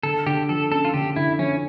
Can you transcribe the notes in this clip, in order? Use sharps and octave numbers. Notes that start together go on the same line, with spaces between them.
D3 A4
D3 G4
F3 A4
C#4 A4
F4
D3 G4
D3 E4
F3 C#4